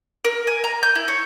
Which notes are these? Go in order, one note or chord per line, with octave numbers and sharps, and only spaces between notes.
A#4
G#5
A#5
G6
E4
C#5